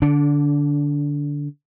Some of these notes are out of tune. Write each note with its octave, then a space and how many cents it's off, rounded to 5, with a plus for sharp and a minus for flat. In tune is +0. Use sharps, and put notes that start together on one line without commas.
D3 +0 D4 -25